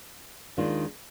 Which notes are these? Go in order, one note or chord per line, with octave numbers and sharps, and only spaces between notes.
D#2 D#3 G#3 D4 F4